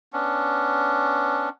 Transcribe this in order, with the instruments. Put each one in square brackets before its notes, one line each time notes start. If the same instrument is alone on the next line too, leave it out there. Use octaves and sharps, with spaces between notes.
[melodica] B3 C#4 D4